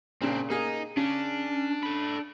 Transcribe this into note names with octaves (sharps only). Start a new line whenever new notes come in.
A#2 C#3 C4 D4
A#3 D#4 G#4
C#3 C#4 D4
A4 B5